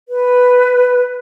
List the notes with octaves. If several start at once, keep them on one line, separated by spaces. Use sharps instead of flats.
B4